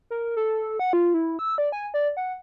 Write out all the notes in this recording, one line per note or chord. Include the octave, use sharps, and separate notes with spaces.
A#4
A4
F#5
F4
E4
E6
D5
G#5
D5
F#5